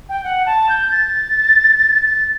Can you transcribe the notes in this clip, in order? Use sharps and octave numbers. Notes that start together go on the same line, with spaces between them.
G5
F#5
A5
G6
A6
A6